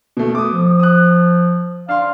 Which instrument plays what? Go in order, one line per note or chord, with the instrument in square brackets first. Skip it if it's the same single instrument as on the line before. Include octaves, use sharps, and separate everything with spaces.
[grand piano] B2 A3
D6 D#6
[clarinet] F3
[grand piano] D#6 F#6
[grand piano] D4 C6 [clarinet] F5